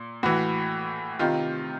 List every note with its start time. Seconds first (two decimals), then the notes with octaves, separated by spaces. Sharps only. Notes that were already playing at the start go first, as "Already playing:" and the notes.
Already playing: A#2
0.23 A2 E3 F#4
1.19 C3 D#3 F4